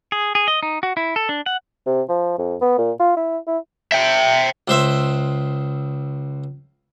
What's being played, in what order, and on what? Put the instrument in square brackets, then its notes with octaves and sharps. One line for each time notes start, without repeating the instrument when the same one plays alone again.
[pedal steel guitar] G#4
G#4
D#5
D#4
F#4
E4
A4
D4
F#5
[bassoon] C3
F3
F2
B3
A#2
F4
E4
E4
[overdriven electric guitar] E5 G5
[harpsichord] C#2 C5 E5